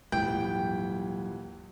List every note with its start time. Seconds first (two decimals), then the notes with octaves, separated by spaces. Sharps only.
0.12 D#1 G#2 E3 F#3 G3 G5